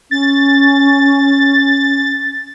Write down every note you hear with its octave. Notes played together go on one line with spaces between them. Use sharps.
C#4 A6